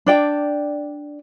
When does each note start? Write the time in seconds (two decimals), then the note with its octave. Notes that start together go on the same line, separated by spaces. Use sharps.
0.06 D4 D5 G5